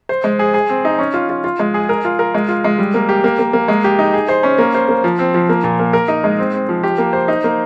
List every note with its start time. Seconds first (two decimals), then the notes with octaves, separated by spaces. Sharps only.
0.09 C5
0.24 G#3
0.39 G#4
0.54 G#4
0.69 C4
0.85 D#4
0.99 C#4
1.14 F4
1.30 F4
1.44 F4
1.59 G#3
1.74 G#4
1.89 A#4
2.05 F4
2.19 A#4
2.34 G#3
2.48 F4
2.64 G#3
2.78 G3
2.94 A#3
3.09 G4
3.24 A#3
3.39 A#3
3.53 A#3
3.68 G#3
3.84 G4
3.99 D#4
4.13 G#4
4.29 C5
4.43 C#4
4.58 A#3
4.74 C5
4.88 A#3
5.04 F3
5.19 C4
5.34 F3
5.49 A#3
5.64 A#2
5.79 A#3
5.93 A#4
6.08 D#4
6.24 G#3
6.39 C4
6.54 C4
6.69 F3
6.83 G4
6.98 A#3
7.13 C5
7.28 D#4
7.44 A#3